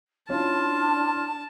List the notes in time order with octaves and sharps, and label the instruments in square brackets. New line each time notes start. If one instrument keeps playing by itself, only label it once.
[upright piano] F#3 C#4 F4 [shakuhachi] D4 [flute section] E4 C6 F6 [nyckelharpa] A5